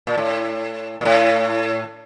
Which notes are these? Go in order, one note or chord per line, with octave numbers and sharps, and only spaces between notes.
A#2
A2
A#2
A2